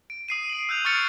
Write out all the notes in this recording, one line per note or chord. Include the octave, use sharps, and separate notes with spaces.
D7
D#6 C7 D#7
D7 F#7
E6 F#6 G6 F7
C#6 D#6 F6 A6 C#7 F7